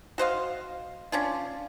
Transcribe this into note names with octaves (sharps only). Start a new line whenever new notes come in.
F#4 C5 D#5 F5
C#4 D4 F4